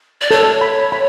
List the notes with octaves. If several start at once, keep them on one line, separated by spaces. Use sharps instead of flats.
D5
A4 C#5
B5
B5